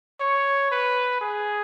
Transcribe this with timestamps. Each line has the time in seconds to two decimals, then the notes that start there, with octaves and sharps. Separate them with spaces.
0.20 C#5
0.71 B4
1.21 G#4